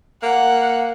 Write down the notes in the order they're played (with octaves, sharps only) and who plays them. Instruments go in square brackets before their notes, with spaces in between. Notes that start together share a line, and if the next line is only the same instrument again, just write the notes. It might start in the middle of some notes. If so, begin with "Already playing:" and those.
[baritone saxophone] A#3 [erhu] F#5